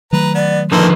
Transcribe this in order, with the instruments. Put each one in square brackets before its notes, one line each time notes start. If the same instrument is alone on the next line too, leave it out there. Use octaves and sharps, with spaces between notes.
[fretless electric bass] D#3 F#3 A3 [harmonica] B4 A#5
[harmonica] B3 [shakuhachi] D5
[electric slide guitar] D3 D#3 F3 [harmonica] A#3 A4 C5 [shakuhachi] B4